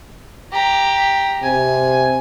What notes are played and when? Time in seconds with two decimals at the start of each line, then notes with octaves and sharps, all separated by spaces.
0.52 G4 A#5
1.43 C3 G#5